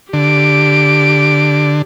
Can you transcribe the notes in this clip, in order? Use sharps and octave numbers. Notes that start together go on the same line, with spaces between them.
D3 G4 D7